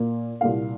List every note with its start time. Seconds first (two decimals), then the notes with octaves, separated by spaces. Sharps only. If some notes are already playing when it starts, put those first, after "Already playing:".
Already playing: A#2 A#3
0.41 C2 A#2 A#3 F5